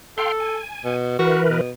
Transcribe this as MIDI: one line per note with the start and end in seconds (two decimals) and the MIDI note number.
0.18 0.58 69
0.18 0.32 77
0.18 0.32 79
0.18 0.32 84
0.40 0.96 80
0.85 1.19 47
1.19 1.61 52
1.19 1.42 66
1.19 1.61 70
1.19 1.61 71
1.50 1.70 47